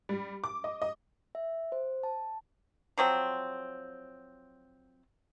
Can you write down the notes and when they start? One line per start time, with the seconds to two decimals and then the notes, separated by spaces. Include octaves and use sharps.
0.09 G3
0.44 D6
0.64 D#5
0.82 D#5
1.35 E5
1.72 C5
2.03 A5
2.98 F3 F#3 C4